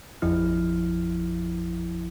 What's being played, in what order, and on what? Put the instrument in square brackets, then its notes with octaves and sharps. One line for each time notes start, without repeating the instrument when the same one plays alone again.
[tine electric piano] A1 F2 F3 E4 F6